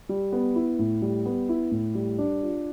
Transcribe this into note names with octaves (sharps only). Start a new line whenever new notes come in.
G3
B3
E4
A2
G3
B3
E4
A2
G3
D4
F4